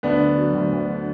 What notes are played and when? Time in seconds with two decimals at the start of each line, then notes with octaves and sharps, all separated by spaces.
0.03 D2 B3 D4
0.20 D3
0.37 F#3
0.55 D2
0.73 D2
0.89 D3